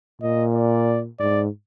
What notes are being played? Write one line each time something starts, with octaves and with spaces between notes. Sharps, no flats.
A#2 D#5
D5
G#2 D5